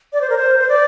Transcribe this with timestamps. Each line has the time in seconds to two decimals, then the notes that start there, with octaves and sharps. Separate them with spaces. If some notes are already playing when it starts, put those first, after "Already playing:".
0.13 D5
0.21 C5
0.30 A#4
0.37 C5
0.60 C5
0.69 D5